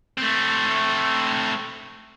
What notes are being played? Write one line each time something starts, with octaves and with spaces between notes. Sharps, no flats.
A3 C4